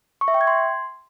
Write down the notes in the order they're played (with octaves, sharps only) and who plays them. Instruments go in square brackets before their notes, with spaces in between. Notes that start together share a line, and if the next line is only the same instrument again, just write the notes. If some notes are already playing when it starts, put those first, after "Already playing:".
[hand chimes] C#6
E5
G5
G#6
C6